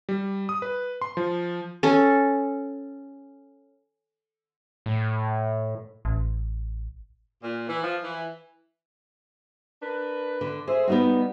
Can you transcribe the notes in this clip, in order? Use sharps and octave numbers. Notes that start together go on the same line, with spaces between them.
G3
D#6
B4
C6
F3
C#4 A4
A2
A1
A#2
E3
F3
E3
D4 A#4 B4
D3
G#4 A4 C5 E5
G3 B3 D#4 F#4